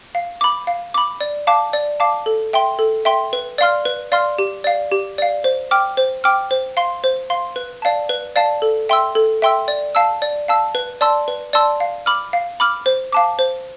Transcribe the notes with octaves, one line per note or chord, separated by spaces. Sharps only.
F5
B5 D6
F5
B5 D6
D5
F5 A5 D6
D5
F5 A5 D6
A4
E5 G5 C6
A4
E5 G5 C6
B4
D5 F5 C6 F6
B4
D5 F5 C6 F6
G4
D5 F5
G4
D5 F5
C5
G5 D6 F6
C5
G5 D6 F6
C5
F5 C6
C5
F5 C6
B4
D5 F5 A5
B4
D5 F5 A5
A4
E5 G5 C6 E6
A4
E5 G5 C6 E6
D5
F5 A5 E6
D5
F5 A5 E6
B4
D5 A5 C6 E6
B4
D5 A5 C6 E6
F5
B5 D6 F6
F5
B5 D6 F6
C5
F5 A5 D6
C5